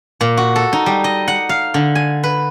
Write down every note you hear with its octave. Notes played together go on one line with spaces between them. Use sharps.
A#2
F#4
A4
D#4
G3
D#5
F#5
F5
D3
G#5
B4